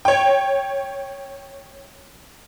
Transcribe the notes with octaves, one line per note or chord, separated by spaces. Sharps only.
C#5 G5